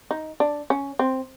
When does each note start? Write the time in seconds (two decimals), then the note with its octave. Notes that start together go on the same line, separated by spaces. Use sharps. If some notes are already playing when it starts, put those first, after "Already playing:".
0.11 D#4
0.40 D4
0.70 C#4
0.99 C4